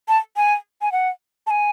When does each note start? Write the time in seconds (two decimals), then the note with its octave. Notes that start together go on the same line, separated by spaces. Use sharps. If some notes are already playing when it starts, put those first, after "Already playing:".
0.08 A5
0.37 G#5
0.82 G#5
0.92 F#5
1.47 A5
1.50 G#5